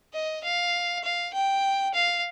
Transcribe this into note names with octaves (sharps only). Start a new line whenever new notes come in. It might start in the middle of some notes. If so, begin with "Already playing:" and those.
D#5
F5
F5
G5
F5